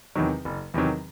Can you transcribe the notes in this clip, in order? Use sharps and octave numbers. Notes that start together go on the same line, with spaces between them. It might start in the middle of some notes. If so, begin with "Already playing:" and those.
E2 C3 D#3 F#3
F#1
E2 C3 D#3 F#3